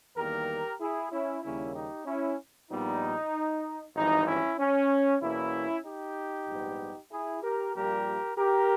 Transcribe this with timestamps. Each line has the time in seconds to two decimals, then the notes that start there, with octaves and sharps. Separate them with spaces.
0.17 E2 D#3 G3 A#3 G4 A#4
0.81 E4 G#4
1.11 C#4 E4
1.43 D#2 C#3 G3 A#3 C#4 E4
1.75 D#4 G4
2.06 C#4 E4
2.70 A#1 A#2 G3 B3 D#4
3.96 G#1 G2 E3 D#4
4.27 C#4 E4
4.59 C#4
5.22 E2 B2 A#3 C#4 E4
5.85 D#4 G4
6.48 A#1 G#2 G3 B3
7.11 E4 G#4
7.42 G4 A#4
7.75 A#1 A#2 G3 A#3 G4 A#4
8.37 G4 A#4